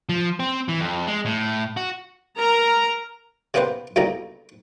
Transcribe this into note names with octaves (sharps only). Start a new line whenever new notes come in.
F3
C4
E3
F2
G#3
A2
F#4
A#4 A#5
C3 A#3 B3 G4 B4 C5
D2 B2 G3 A#3 D#4 A#5